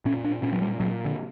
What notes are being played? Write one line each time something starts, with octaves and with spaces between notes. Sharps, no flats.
A#2 C#4
D4
A#2 C#4
F#3
G3
A#2 F#3
D3